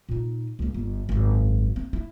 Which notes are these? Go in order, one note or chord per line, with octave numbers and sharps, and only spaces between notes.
A#2 D#4
C#2 A#3
G1
G#1 F#2
C4
E4